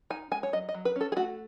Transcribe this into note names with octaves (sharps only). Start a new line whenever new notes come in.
D#4 G#5
G#3 G#5
C#5
F#3 D#5
D#5
F#3
B4
C#4 A4
G#4
A3 F#4